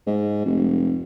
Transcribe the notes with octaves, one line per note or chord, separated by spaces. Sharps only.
G#2
F1